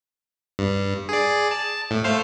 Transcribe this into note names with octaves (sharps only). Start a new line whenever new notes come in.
G2
G#4 D5
A5
A2
A3 C5 F5